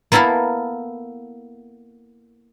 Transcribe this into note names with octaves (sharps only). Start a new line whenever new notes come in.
A#3 B3 E4 A4 A#4 F5